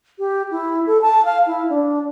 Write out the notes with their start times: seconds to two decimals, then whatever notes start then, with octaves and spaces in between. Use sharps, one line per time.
0.19 G4
0.51 E4
0.87 A4
1.02 A5
1.25 F5
1.46 E4
1.69 D4